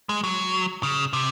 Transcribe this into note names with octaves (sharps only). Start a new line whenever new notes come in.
G#3
F#3
C#3
C3